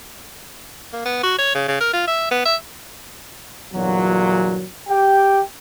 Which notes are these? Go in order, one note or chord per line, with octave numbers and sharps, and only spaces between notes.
A#3
B3
F#4
C#5
C#3
C#3
A#4
F4
E5
B3
E5
G1 E2 A#2 F#3
G4 G5